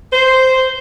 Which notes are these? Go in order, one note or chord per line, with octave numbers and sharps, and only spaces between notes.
C5